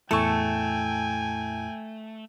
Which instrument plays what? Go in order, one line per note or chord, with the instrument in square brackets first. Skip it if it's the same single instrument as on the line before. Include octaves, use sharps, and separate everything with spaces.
[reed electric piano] E2 A2 E4 [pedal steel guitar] A3 [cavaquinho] A4 C#6 [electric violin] G5 G#5